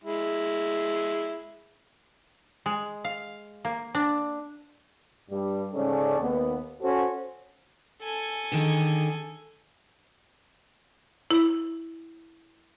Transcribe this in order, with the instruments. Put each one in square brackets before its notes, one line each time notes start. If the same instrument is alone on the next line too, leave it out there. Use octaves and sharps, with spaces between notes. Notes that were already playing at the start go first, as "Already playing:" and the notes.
[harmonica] G#3 E4
[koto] G#3
F5
A#3
D4
[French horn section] G2 G3
G#2 C#3 C#4 G#4 A4 D5
D#2 B3
C#4 F#4 A4 C5
[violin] A4 G#5
[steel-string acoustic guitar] D3 D#3 G#4
[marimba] E4